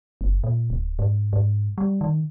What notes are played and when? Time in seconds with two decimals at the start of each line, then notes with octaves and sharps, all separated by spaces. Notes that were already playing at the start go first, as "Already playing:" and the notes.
0.21 F#1
0.44 A#2
0.70 D1
0.99 G#2
1.33 G#2
1.78 G3
2.01 D#3